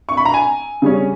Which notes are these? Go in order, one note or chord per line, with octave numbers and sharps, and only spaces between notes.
C#6
B5
A#5
G#5
C#3 G3 C#4